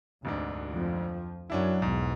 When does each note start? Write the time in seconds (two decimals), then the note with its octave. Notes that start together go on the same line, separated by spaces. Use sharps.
0.25 F1 D2 G#2 D4
0.71 F2 F3
1.50 F#2 F#3 C#4 D4 E4
1.82 B1 E2 G#2